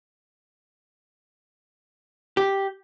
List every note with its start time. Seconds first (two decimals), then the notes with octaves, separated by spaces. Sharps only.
2.37 G4